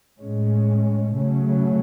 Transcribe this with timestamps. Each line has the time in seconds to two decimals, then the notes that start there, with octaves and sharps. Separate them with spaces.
0.19 A2 G#3 C#4
1.15 C#3 F#3 A3 C#4